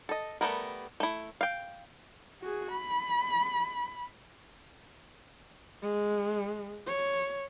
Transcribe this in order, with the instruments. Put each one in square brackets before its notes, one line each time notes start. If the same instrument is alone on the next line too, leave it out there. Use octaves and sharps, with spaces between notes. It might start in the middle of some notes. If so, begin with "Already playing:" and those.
[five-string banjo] A4 D#5
G3 A3 B3 E4 A#4
A3 E4
F5 G5
[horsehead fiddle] F#4 G#4
B5
G#3
C#5